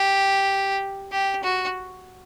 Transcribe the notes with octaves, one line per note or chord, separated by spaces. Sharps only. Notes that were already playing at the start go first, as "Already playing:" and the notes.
Already playing: G4
G4
F#4